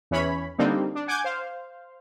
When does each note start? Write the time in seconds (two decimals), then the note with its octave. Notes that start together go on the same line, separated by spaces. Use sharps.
0.11 E2 E3 C#4 C#5 B5
0.58 D3 G3 A#3 C4 D4 D#4
0.95 D4
1.07 F#5 G#5 D6 G6 G#6
1.24 C5 F5